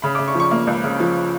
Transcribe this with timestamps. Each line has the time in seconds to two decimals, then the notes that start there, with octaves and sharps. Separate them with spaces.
0.02 C#3 B5
0.15 D6
0.19 C#3
0.28 C#6
0.34 F3
0.40 C#6
0.51 A#3
0.67 C#2
0.84 C#3
1.00 F3